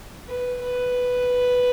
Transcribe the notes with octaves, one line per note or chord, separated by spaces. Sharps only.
B4
B4